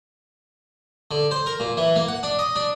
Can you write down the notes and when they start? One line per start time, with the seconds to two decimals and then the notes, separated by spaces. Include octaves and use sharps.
1.11 D3
1.31 C5
1.46 A#4
1.60 A#2
1.77 E3
1.96 A#3
2.08 F#5
2.23 D4
2.39 D#5
2.56 D4